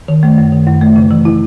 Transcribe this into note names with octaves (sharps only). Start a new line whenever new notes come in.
D#3
A3
F#2
D#3
F#2
A3
C#3
E3
E4